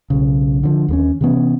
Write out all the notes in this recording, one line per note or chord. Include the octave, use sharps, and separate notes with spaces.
B1 C#3
D3 E3 F3
D#2 G3 C#4
C3 E3 B3 C#4